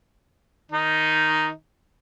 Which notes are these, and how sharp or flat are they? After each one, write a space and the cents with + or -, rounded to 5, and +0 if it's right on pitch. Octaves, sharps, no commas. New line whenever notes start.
D#3 +0 D#4 +0